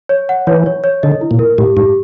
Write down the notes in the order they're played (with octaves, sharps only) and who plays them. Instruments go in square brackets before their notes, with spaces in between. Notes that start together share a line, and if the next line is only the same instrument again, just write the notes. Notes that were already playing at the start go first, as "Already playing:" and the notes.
[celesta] C#5
F#5
[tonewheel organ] E3 [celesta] C#5
[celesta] C#5
C#5
[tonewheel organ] D3 [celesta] D#5
[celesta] E4
[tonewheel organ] A#2
[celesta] A#4
[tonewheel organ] A2 [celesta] G4
[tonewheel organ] G#2 [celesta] G4